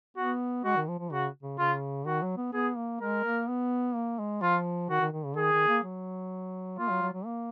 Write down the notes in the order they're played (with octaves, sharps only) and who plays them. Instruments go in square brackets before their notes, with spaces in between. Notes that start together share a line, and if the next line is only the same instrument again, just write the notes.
[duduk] B3 [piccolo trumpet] F#4
[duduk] G#3 [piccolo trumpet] F#4
[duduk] D#3
F3
F3
[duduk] C#3 [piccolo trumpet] F#4
[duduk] C#3
[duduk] C#3 [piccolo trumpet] F4
[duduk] D#3 [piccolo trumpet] F#4
[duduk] F#3
B3
[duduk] B3 [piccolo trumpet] G#4
[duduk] A#3
[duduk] G#3 [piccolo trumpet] A#4
[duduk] A#3
B3
A#3
G#3
[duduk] F3 [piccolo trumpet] F4
[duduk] D#3 [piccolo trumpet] F#4
[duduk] D#3
D#3
C#3
[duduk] D#3 [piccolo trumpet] G#4
[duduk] D#3
A#3
F#3
[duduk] A#3 [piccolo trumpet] F4
[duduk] F#3
F#3
F#3
A#3